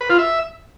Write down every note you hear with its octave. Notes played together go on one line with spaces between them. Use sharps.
B4
F4
E5